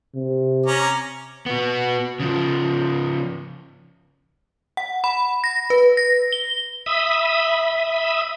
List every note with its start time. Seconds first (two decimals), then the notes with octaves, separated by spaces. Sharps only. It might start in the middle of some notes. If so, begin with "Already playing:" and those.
0.15 C3
0.66 C#4 A#5 D6
1.46 B3 F#4
2.20 C#3 F3
4.77 F#5
5.04 B5
5.44 A#6
5.70 B4
5.97 A#6
6.32 G7
6.86 E5 B5 D#6